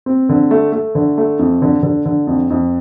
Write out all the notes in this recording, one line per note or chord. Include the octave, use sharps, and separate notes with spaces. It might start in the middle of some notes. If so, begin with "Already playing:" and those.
C4
D3
A3
A3
D3
A3
F2
D3
D3
D3
F2
F2